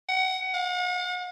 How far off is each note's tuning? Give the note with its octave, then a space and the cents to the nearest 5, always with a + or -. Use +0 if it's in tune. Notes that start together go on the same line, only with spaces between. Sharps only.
F#5 +25
F#5 -45